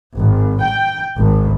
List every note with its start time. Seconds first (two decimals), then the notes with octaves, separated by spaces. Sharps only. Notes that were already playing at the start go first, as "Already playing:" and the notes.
0.18 G#1
0.62 G5
1.17 G#1